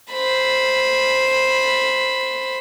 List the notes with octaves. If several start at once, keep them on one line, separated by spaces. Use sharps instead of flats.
C5 B5